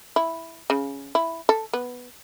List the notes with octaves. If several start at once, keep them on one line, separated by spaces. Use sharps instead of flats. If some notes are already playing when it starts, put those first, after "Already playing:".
E4
C#3
E4
A4
B3